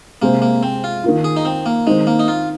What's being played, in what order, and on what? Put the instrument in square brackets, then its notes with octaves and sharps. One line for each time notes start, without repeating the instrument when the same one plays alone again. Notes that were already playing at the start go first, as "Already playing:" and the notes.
[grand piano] C3 G#3 C4 [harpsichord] A#3
[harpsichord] A#3
C4
F4
[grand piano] D#3 A#3 F4
[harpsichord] G#4
D#4
C4
A#3
[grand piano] D#3 C4 D#4 [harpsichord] G#3
[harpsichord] A#3
D#4
F4